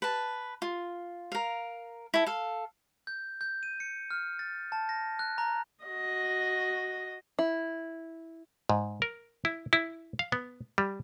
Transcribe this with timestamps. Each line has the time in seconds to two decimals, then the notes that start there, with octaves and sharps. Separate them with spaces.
0.02 B4 A5
0.62 F4
1.32 A#4 F5
2.14 E4 A4
2.27 A4 F5
3.07 G6
3.41 G6
3.63 D#7
3.80 C#7
4.11 F6
4.39 A6
4.72 A5
4.89 A#6
5.19 F#6
5.38 A#5
5.85 F#4 D#5
7.39 E4
8.70 G#2
9.02 A#4
9.45 E4
9.73 E4
10.19 F5
10.32 B3
10.78 G3